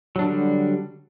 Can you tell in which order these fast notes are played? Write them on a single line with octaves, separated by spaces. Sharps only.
F#3 D4 D3 G3